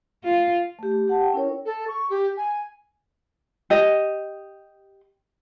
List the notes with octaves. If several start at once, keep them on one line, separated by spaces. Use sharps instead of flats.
F4
A3 G4
G4
G4 F#5 A5
G5
C#4 E4 A#4 C#5
A4
C#6
G4
G#5
G4 D#5